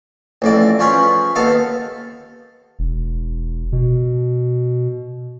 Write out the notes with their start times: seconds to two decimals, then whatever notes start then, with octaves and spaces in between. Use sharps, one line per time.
0.42 A1 F2 D5
0.79 F3 C#4 G#4 B4
1.35 D#2 B3 A4 F5
2.79 E1
3.72 B2